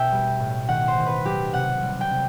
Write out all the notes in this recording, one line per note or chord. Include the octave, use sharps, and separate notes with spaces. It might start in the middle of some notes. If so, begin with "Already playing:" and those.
Already playing: B2 E5 G5
G3
A2
D#3 F#5
C5
D#3
B4
F#3 G4
C3 F#5
G3
G5
C3